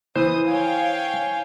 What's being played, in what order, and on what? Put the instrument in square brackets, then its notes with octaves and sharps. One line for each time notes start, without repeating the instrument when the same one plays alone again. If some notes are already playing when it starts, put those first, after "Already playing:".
[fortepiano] E3 [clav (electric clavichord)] C5 [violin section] D#6
[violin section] C#5 F5 G5 [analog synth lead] G#5